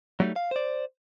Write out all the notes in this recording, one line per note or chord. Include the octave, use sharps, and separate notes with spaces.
F#3 G3 A3 C#4 D#4
F5
C5 D5